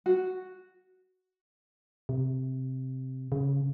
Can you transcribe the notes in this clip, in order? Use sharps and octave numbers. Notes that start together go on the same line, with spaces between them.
F#4
C3
C#3